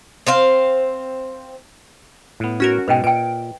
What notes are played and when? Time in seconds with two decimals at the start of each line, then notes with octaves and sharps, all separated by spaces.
0.27 C4 C5 F5
2.40 A2 B3
2.60 C#4 F#4 A#4
2.88 G#2 B2 G#3 B4 D#5 G5
3.04 A#2 B4 G5 D7